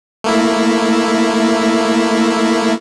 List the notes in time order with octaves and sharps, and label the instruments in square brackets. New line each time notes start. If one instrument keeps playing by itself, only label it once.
[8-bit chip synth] A3 A#3 E4